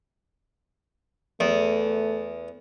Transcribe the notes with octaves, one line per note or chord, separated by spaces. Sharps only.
E2 A3